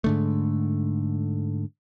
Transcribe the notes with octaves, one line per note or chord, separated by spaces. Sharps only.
G#2 D3 A3